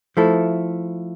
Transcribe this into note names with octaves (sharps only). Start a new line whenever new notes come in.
F3 A3 E4 A4